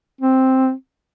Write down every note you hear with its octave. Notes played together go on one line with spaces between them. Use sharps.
C4